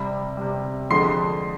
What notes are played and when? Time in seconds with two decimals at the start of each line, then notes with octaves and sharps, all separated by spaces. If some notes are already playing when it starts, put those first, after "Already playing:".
Already playing: C3 G3 B5
0.37 C3 G3
0.90 F2 D3 G#3 C6 C7